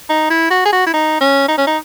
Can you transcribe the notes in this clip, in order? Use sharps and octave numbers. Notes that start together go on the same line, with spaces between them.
D#4
E4
F#4
G#4
F#4
E4
D#4
C#4
D#4
C#4
D#4